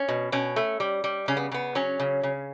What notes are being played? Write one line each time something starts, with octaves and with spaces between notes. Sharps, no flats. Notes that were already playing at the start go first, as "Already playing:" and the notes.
Already playing: C#4
B2
B2 C#4
A3
G3
G3
C#3 C#4
B3
C#3 B3
F#3 C#4
C#3
C#3